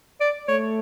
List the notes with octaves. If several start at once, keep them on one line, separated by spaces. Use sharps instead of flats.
D5
A3 C#5